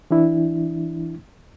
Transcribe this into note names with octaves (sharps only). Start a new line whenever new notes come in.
E3 D4 E4